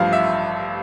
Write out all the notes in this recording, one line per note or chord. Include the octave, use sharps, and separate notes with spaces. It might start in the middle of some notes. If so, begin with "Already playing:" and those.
Already playing: A1 G2 F3 F5
E5